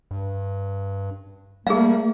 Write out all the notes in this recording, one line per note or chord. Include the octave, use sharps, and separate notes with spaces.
G2
G3 A3 A#3 G#4 F5